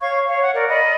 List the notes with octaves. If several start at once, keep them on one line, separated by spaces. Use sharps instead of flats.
C#5 F5 C#6 G#6
C#5 F5
F#5
A#4 D5
D5 D#5 B5